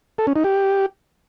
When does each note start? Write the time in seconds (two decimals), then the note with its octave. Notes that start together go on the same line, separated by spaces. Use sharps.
0.18 A4
0.27 C#4
0.36 D#4
0.44 G4